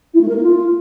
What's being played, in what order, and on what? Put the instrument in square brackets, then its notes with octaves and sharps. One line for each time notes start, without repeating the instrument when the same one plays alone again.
[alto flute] E4
A3
A#4
A#3
F4